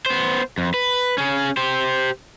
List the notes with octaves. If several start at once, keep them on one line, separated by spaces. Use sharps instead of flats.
B3 C5
F2
B4
C#4 G#4
G4 C5